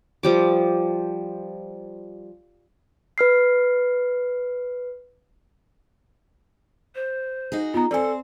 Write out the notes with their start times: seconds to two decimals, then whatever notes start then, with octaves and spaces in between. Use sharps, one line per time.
0.23 F3 G3 D6
3.18 B4 F6 C7
6.95 C5
7.52 D#4 F#4 G#4
7.74 B3 F4 A#5
7.91 C4 A4 C5 D5 G#5